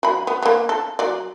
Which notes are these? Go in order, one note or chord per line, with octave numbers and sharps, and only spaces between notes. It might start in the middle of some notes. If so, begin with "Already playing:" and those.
F#3 B5
B3
A#3 B3
A4
F#3 D5